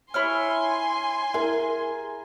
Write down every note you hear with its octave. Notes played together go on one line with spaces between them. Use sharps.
E4 C#5 G#5 C6 F6
E4 G#4 A#4